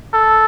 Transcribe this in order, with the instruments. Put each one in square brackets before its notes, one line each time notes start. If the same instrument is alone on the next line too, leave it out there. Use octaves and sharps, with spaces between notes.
[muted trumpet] A4